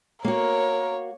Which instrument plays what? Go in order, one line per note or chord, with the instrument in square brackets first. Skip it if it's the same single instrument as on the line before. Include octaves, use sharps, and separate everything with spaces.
[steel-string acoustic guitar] A#3 F#4 [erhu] A#4 [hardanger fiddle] C#5